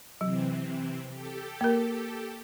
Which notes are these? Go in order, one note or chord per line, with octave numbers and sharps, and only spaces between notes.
C3 E3 F#3 C4
G4 A4
A#3 A#4